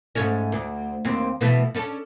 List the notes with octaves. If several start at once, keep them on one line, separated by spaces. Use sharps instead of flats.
G#2 A3 C#4
D2
D#2 C4
B2 E3 A3
C#4 D4 A4